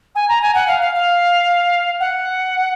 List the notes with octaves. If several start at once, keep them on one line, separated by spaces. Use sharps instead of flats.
G#5
A#5
G#5
F#5
F5
F5
F5
F#5